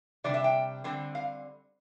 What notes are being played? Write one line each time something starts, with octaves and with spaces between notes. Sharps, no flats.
C3 G3 D4 D5
E5
G5
D3 G3 C4
F5